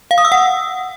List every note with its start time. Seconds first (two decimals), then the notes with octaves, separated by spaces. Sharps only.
0.11 F5
0.18 D#6
0.25 E6
0.32 F#5